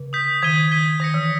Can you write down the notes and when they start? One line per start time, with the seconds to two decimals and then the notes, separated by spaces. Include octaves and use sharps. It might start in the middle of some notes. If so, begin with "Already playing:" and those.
Already playing: C#3
0.13 D#6 G6 B6
0.42 D#3 G#6 B6 D#7 G7
0.71 G#6 B6 D#7 G7
1.00 D#3 D#6 A#6 C#7
1.14 E3